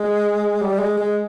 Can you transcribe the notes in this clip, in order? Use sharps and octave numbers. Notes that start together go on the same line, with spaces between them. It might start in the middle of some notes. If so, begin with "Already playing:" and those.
Already playing: G#3
G3
G#3
G#3